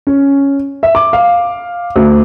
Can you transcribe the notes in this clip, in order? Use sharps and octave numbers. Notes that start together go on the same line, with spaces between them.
C#4
E5
D6
F5
D2